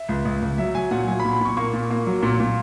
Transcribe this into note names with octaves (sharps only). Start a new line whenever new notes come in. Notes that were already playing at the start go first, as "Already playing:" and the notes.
Already playing: E5
C#2
C#2
C#2
F#3 E5
F#3 G#5
A#2 F#5
F#3 G#5
B5
A#2
B5
A#2 C#6
A#3 C#6
A#2
A#3
F#3
A#2
A#2